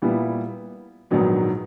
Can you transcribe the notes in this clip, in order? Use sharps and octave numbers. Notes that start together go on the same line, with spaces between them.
A#2 G3 B3 E4
A#1 G#2 D#3 F#3 B3